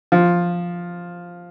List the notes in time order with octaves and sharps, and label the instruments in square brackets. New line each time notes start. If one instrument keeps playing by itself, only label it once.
[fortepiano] F3